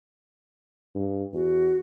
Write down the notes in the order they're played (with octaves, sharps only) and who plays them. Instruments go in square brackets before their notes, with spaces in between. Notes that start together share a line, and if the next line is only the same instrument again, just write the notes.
[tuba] G2
[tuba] E2 [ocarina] F#4